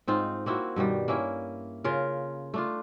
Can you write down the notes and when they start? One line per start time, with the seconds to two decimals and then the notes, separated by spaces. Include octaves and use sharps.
0.07 G#2 C4 D#4 F4
0.46 A#3 C4 E4 F#4
0.76 G2 B2 D#3 G3
1.08 A#3 C#4 E4
1.84 C#3 F4 A#4
2.54 A3 D4 F4